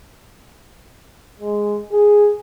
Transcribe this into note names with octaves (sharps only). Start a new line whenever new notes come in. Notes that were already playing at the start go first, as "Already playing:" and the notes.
G#3
G#4